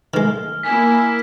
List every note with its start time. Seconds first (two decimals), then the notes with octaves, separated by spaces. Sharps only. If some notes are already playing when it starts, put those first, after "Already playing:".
0.14 D#3 G#3 F6
0.63 A#3 E4 G#5 B6